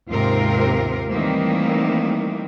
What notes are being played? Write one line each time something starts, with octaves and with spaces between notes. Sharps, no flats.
D#2 G#2 C3 C4 F4 A#4
D#3 E3 G3 A3 A#3 C4